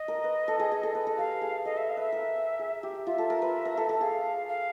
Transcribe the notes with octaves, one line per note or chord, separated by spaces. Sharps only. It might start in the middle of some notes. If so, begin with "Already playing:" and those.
Already playing: D#5
A#4
B4
A4
G#4
G#4
A4
B4
A4
G4 F5
G#4
A4 D#5
E5
F5
B4 E5
A#4
G#4
G4
F4 E5
A4
A#4
B4
A#4
A4
A4
G#4 F5
F5